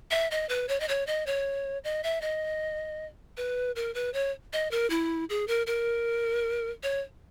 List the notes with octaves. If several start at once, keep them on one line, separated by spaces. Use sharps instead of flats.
E5
D#5
B4
C#5
D#5
C#5
D#5
C#5
D#5
E5
D#5
B4
A#4
B4
C#5
D#5
A#4
E4
G#4
A#4
A#4
C#5